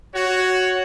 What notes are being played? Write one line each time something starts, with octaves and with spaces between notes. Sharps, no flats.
F#4 C#5